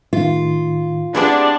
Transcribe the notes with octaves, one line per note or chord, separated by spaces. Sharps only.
A2 D#3 F4
B3 C4 D4 E4 G4 G#4 B4